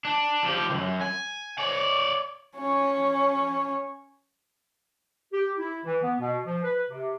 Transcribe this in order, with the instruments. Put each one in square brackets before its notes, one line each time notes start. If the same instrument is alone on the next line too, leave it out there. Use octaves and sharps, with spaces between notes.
[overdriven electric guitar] D4
F3 G4
C2 F#2
G#5
C#5 D5
[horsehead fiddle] C#4 C#5
[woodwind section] G4
E4
E3
B3
B2
F3
B4
C3